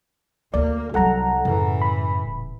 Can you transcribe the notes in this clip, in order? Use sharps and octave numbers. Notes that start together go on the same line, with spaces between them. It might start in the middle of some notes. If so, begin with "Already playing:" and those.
D2 A#3 D5
C2 F#3 G3 A4 F#5 A#5
F#2 A2 C#3 E3
B5
D#1